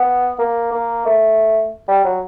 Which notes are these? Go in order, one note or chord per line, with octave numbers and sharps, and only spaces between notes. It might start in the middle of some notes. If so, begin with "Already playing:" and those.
Already playing: B3
A#3
A#3
A3
G3
F#3